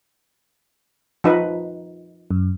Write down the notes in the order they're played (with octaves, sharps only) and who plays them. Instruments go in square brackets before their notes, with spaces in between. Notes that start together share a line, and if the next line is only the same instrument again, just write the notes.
[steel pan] F3 D#4 B4
[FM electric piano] F#2